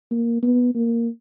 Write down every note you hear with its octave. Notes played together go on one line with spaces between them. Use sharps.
A#3
B3
A#3